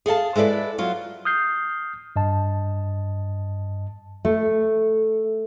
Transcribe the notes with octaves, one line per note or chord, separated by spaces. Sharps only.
G#4 A4 F5 A5
G#3 E4 A4 B4 D5
F#3 F4
D#6 F6 G6 C7
G2 D#5 A5
A3